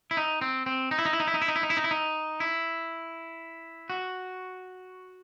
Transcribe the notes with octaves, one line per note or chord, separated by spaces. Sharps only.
E4
D#4
C4
C4
D#4
E4
D#4
E4
D#4
E4
D#4
E4
D#4
E4
D#4
E4
D#4
E4
D#4
E4
F#4